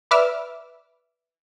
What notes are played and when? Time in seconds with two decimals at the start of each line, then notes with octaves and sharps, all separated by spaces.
0.11 B4 D5 E5 D6 E6 F6